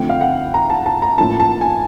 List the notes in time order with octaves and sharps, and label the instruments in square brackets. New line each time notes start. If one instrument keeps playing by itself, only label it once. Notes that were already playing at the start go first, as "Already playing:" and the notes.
Already playing: [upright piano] D3 F3 A3 C4 G5
F5
F#5
A#5
A5
A5
A#5
A2 F3 A#3 C#4 E4 A5
A5
G#5